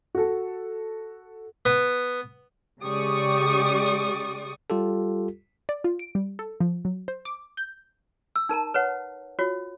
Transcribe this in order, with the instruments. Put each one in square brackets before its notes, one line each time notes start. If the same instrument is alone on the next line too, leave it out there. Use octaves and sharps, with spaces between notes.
[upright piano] F#4 A4
[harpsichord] B3
[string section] C#3 G#3 G4 D5 C#6 D#6
[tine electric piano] G3 F4 G4 A4
[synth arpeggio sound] D5
F4
D7
G3
A4
F3
F#3
C5
D6
G6
[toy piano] E6
D#4 A#4 A5 A#5
B4 C#5 F#5
F4 F#4 C#5